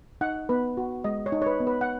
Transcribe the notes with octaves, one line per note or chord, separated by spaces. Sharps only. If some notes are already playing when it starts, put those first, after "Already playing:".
D#4 F#5
B3 B4
F#4
G#3 D#5
C#5
D#4
C#5
B4
B3
B4
F#5